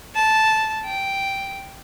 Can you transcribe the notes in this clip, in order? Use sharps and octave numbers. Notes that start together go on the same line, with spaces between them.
A5
G5